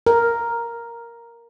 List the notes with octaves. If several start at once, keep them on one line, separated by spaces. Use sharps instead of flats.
A#4